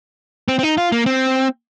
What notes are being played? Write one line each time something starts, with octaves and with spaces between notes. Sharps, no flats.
C4
C4
D#4
F4
A#3
C4